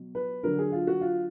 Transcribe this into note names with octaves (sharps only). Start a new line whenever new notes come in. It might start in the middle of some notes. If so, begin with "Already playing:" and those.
Already playing: B2 F#3
B4
D3 F#3 A#4
G#4
F4
F#4
F4